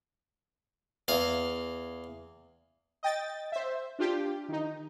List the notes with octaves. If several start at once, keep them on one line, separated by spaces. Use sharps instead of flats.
E2 F5
D#5 G5 A6
C5 E5
D4 F4 G4
D#3 D#4